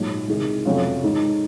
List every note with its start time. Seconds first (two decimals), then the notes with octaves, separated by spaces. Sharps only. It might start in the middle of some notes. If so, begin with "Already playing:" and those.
Already playing: A#1 G#2 F#3
0.28 C2 C3 D#3 G#3
0.65 F2 C3 F#3 C#4 F4
1.03 G#2 D#3 G#3 D#4